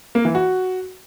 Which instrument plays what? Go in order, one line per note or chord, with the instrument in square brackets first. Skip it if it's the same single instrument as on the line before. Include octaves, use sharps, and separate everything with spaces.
[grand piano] A#3
E3
F#4